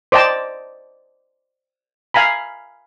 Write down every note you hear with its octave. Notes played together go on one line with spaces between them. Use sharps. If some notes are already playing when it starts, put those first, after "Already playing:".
C5 D5 D#5 G5 A5
F5 G#5 A#5 B5